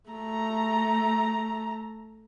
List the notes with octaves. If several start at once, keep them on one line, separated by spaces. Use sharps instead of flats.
A3 A#5